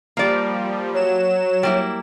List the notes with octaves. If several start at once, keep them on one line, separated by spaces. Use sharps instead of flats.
F3 G3 A#3 D5
F#3 C#5 E7
G3 A#3 E4